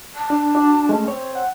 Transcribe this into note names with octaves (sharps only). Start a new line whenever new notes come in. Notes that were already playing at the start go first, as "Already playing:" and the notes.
A5
D4
D4 F#4 D5
G#3 A3 C#4
C4 C#5
F#5